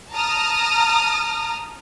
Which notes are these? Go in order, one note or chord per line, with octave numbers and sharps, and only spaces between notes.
A5 A#5 D#6 F6